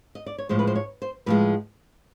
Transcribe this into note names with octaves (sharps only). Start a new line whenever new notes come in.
D#5
D5
C#5
A2 F3 G#3 C5
B4
C5
C#5
C5
A2 F3 G#3 B4